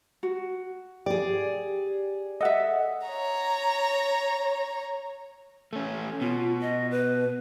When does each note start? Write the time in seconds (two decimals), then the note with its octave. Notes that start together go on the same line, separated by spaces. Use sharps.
0.23 F#4
1.06 G4 G#4 D5
2.41 A4 D#5 E5 F#5
3.07 C#5 A#5
5.73 A3 C#4
6.21 B2 F4
6.62 D#5
6.91 B4